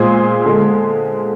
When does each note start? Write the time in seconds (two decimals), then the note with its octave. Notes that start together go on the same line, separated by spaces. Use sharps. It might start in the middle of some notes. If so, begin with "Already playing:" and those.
Already playing: A#2 G#3 G#4 C5
0.45 D3 G#3